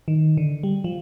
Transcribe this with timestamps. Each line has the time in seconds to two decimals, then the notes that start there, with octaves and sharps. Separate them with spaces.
0.08 D#3
0.37 D3
0.63 G3
0.84 F3